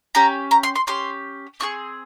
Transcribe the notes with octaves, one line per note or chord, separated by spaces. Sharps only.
C#4 G4 A#5
A#5
C6
C6
C#4 G4 C6
C4 F4 G#4 C#6